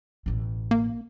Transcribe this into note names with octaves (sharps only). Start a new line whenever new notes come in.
A1 B2
A#3